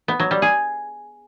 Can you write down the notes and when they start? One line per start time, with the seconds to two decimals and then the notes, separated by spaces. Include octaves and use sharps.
0.08 B3
0.20 F#3
0.31 G3
0.42 G#4